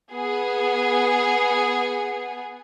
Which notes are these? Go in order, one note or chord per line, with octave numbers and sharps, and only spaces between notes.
B3 G#4